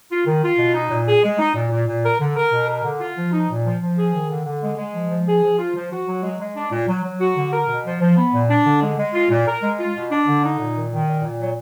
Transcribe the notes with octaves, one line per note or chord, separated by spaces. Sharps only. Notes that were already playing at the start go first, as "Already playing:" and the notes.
F4
D#3
F4
B2
D#4
A#2
G#4
G#3
D#4
A#2
A#2
A#2
A#4
D3
A#4
B2
A#4
D3
F4
F3
D#4
A#2
F3
F3
G#4
D#3
D3
D3
G#3
G#3
F3
F3
G#4
F3
F4
F3
F#4
F#3
G#3
G#3
D4
A#2
F#3
F#3
F#4
D3
A#4
B2
F3
F3
B3
A#2
D4
D3
G#3
G#3
F4
A#2
A#4
G#3
F4
B2
D4
D3
D#4
A#2
D#3
D#3
A#2
A#2
F#3